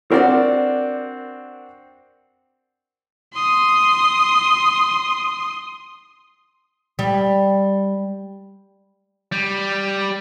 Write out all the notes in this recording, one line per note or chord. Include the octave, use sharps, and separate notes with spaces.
C4 D4 F#4 A#4 D5 F#5
C6 D#6
G3
G3